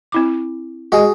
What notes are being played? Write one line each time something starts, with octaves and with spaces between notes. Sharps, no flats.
C4 E4 D6
G#3 F#4 G#4